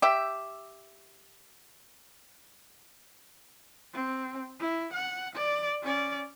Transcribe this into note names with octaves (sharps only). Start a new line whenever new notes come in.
G4 E5
C4
E4
F#5
D5
C#4 D5